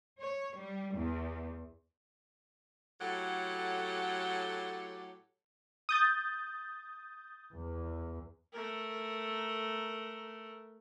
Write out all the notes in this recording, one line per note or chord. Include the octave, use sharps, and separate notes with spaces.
C#5
G3
E2
A2 F#3 G4 A4 F#5
D#6 G6 A6
E2
A3 A#4